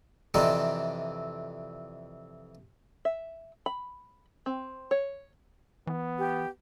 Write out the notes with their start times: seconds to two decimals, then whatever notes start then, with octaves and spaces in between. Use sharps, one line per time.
0.34 F2 C3 E3 C4 D4 D#4
3.05 E5
3.66 B5
4.46 C4
4.91 C#5
5.87 E3 B3
6.19 G4